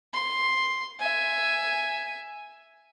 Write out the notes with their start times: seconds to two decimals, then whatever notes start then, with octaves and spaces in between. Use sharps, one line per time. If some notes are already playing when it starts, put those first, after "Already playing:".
0.14 C6
0.99 E5 G#5